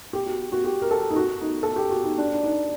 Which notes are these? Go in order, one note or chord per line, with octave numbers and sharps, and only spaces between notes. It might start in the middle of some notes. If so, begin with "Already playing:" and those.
G4
F#4
F#4
G4
A#4
A4
D#4
F#4
D#4
A4
G4
F#4
D#4
D4
D4
D#4